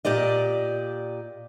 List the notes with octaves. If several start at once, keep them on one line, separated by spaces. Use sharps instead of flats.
A#2 G4 D5 D#5